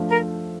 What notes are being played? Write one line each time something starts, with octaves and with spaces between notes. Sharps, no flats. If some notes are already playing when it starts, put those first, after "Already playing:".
Already playing: F3 A3 D4
A#4